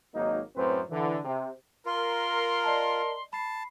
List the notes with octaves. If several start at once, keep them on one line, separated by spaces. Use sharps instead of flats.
G#1 F#3 A#3 D#4
F#2 A2 C4 B4 C5
D3 E3
C3
F4 A#4 C6
D5 D#5 A5
A5 B5 C7